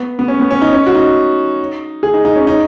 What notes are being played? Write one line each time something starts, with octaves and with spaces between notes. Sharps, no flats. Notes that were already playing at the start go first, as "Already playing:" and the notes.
Already playing: B3
B3
C#4
B3
C#4
D#4
C#4
F#4
D#4
G#4
D#4
D#4
C#4
D#4